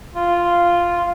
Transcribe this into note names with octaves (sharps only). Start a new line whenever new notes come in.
F4